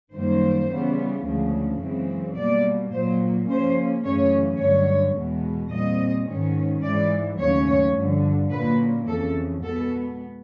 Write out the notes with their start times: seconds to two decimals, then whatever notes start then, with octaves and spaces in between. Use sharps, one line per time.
0.13 F#2 D#3 G3 A#3 C5
0.69 C#3 E3 G3 B3
1.25 D2 C#3 F3 G#3
1.81 F#2 C#3 E3 G#3 C4
2.36 B2 G3 A#3 D5
2.92 A#2 F#3 A#3 C5
3.48 C#3 F3 A#3 C#4 C5
4.04 F#2 C#3 E3 A3 C#4 C#5
4.59 G2 D3 F#3 C#5
5.16 E2 B2 G#3
5.72 A#2 G3 C4 D#5
6.27 G#2 D#3 G#3 C#4
6.83 G#2 E3 G#3 D5
7.39 D#2 C#3 F#3 A3 C#4 C#5
7.96 G2 D3 F3
8.50 A#2 F#3 A#3 C#4 B4
9.06 F2 C#3 E3 A4
9.62 B2 G#3 B3 A4